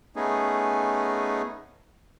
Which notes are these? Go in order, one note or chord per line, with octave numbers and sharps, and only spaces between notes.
A3 B3 C#4 D#4 G#4